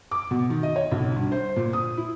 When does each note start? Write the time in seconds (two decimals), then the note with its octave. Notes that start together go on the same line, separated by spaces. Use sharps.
0.11 D6
0.31 B2
0.50 D#3
0.63 D#5
0.76 C#5
0.91 B1
1.16 G2
1.32 C5
1.56 A#2
1.73 D#6
1.97 E4